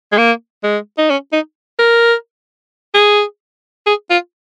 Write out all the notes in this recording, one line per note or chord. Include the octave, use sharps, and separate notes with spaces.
G#3
A#3
G#3
D#4
C#4
D#4
A#4
G#4
G#4
F4